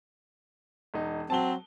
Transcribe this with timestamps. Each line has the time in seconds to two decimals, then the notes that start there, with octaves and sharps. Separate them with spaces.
0.94 E1 D#4
1.30 F#3 C4 A5 G7